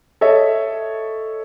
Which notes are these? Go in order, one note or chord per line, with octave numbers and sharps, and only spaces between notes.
A4 C#5 D#5 E5